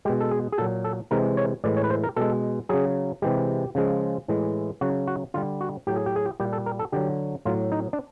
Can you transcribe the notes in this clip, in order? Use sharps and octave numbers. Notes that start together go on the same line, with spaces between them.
B2 G#3 G4
A4
G#4
G#4
A#2 F#3 A4
A4
C3 E3 G#3 A#4
C#5
A2 E3 G#3 D5
C#5
B4
C5
A#4
B2 G#3 A4
C#3 F#3 G#4
C3 E3 G#3 G4
C#3 F3 G#3
A2 E3 G#3
C#3 F#3 F#4
F#4
D3 G3 F4
F#4
A2 F#3 G4
G#4
G4
G#4
G4
A#2 G3 G4
A4
A#4
A4
D3 F#3 G4
A2 F#3 F4
D#4
D4